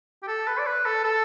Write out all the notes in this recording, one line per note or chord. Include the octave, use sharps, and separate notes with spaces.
G4
A4
B4
D5
B4
A4
A4